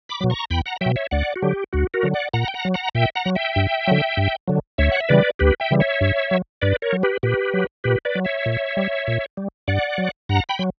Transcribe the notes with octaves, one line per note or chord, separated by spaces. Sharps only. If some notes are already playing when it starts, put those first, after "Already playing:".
B5 D6
B2 F#3
A#5 C#6
E2 G5 B5
F#5 A#5
B2 F#3 E5 G5
C#5 E5
D2 D5 F#5
F#4
D3 F#3 G4
D2 F#4
F#4 A#4
D3 F#3
D5 F#5
A#2 F#5 A#5
G5
F#5 A#5
F#3
F#5 A#5
A#2 E5 G5
F#5 A#5
F#3
E5 G5
G2
D3 F#3
G2
D3 F#3
D2 C#5 E5
F#5
E5
C#3 E3 G3 B4 D5
D2 G4 B4
E5 G5
C#3 E3 G3
C#5 E5
G2
F#3
G2 B4 D5
A#4 C#5
F#3
G4 B4
A#2 G4 B4
F#3
A#2 G4 B4
B4 D5
F#3
C#5 E5
A#2
G3
A#2
G3
G2 D5 F#5
F#3
G2 F#5 A#5
G5 B5
F#3